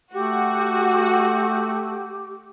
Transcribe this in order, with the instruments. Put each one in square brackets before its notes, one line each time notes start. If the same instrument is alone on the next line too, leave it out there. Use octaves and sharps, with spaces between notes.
[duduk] A3 [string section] F#4 [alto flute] G4